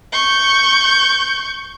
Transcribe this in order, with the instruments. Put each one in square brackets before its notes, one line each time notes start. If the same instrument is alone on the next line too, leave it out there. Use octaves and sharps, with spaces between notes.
[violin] C#6 G6